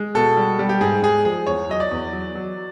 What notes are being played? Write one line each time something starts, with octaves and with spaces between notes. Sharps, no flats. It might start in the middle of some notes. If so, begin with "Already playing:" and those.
Already playing: G#3
B2 A4
G3
G3
G4
G#2 G#4
G#3 G#4
F3 G#4
E2 C#5
F#3 D#5
D5
E2
F#3
F#3